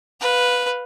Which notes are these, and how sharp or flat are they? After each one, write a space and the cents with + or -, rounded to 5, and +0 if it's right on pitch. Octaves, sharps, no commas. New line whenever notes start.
B4 +0 F5 +25